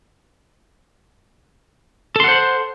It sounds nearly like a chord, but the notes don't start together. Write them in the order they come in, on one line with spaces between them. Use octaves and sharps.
A4 C6 F#5 C5